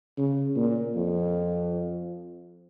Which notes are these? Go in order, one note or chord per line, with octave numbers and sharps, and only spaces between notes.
C#3
A#2
F2